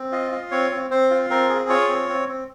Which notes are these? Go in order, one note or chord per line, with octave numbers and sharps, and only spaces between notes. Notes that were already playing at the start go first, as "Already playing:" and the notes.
Already playing: C4
F4 D#5
F4
C4 C#5
C4
C4 C5
F4
C4 A#4
G#4
F4 C#5
C4
C4
C4